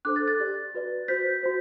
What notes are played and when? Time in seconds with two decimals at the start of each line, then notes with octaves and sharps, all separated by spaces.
0.05 D4 A4 C5 D6 F#6
0.16 F#6 A6
0.28 F#6 A6
0.40 G4 D5
0.74 F#4 B4 D5
1.08 F#4 C5 G6 B6
1.43 F#4 C5